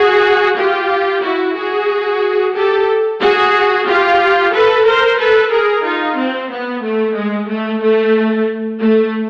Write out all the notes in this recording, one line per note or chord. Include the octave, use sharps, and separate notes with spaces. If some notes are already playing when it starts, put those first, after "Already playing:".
Already playing: F#4 G#4
F4 G4
E4 F#4
F#4 G#4
G4 A4
F#4 G#4
F4 G4
A4 B4
A#4 C5
A4 B4
G#4 A#4
D#4 F4
C4
B3
A3
G#3
A3
A3
A3